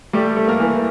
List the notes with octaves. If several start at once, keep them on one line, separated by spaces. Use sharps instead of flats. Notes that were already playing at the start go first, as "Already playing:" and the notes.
G3 A3 G4
A3
A#3 A#4
E3